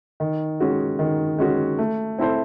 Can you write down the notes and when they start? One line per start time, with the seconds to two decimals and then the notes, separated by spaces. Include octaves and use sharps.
0.20 D#3
0.60 G#3 C#4 F#4
0.99 D#3
1.38 G#3 C#4 F#4
1.78 A3
2.19 C4 E4 A4 C5